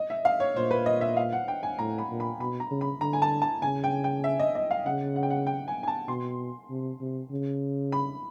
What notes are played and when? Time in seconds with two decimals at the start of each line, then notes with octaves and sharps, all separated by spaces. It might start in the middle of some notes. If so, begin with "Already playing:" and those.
Already playing: D#5
0.10 E5
0.25 F5
0.40 C#5
0.56 A#2 C5
0.71 B4
0.86 D#5
1.01 E5
1.17 F5
1.32 F#5
1.48 G5
1.63 G#5
1.79 A2 A#5
1.98 B5
2.10 A#2
2.20 B5
2.39 B2 B5
2.60 A#5
2.71 C#3
2.81 B5
3.01 D3 A#5
3.13 G#5
3.22 A5
3.42 A5
3.62 C#3 G#5
3.84 G5
4.04 G5
4.24 E5
4.40 D#5
4.55 D#5
4.71 F5
4.86 C#3 F#5
5.16 F#5
5.23 G5
5.30 F#5
5.47 G5
5.68 G#5
5.83 G#5
5.88 A5
6.08 B2 C6
6.70 C3
7.01 C3
7.31 C#3
7.92 B5